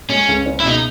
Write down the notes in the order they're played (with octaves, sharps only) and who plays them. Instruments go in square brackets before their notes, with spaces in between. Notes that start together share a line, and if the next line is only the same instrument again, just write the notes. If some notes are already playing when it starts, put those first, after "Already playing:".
[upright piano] G#3 [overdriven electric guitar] C#4
[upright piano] C#2
C#4
[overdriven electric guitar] E4
[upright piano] B2 [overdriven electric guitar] D#4